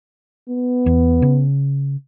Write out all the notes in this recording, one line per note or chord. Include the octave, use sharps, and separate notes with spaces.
B3
E2
C#3